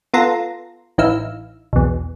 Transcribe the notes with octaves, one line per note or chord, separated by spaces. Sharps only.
B3 F4 A4 A#5 C6 A#6
A1 E3 D#4 E5 F5 E6
B1 E2